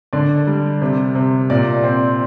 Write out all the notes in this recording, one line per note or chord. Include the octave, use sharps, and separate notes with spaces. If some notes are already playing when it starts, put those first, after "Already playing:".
D3 D5
G3
C3
C3
A#2 D5
C4